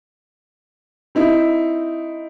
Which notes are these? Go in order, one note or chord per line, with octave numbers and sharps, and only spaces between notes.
C4 D#4 E4